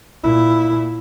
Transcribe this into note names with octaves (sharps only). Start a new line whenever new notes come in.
A#2 E4